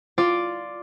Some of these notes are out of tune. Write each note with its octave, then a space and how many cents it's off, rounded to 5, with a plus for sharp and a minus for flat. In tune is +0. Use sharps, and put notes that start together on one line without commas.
F4 +0 D5 +0